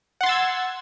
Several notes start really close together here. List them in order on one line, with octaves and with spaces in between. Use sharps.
F#5 C6 A6 E6 G#6